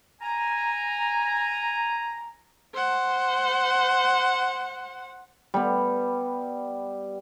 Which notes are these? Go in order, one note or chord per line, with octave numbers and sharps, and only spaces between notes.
G#5 A#5
C5 F#5
G3 B3